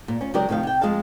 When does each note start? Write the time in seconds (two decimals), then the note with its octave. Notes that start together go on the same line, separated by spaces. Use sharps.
0.08 A#2
0.21 C#4 F4
0.34 C#3 F#3 G#3 G4 A#4 D5
0.49 D2 C3 D#3 F3 F5
0.63 C3 G5
0.81 F2 G#3 F4 F5 A5